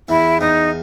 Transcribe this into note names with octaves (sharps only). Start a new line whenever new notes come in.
E2 E4
E2 D#4